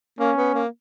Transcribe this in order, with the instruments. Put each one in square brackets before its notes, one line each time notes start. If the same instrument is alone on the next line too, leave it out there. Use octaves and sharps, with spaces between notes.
[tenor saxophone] A#3 [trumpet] C#4
[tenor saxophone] B3
A#3